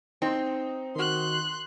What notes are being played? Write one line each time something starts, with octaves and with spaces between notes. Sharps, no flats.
C4 D#4
D#3 F#4 C6 F#6